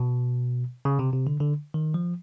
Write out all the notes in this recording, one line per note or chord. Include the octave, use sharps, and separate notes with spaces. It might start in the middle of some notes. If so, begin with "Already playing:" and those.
Already playing: B2
C#3
C3
C3
D3
D3
D#3
F3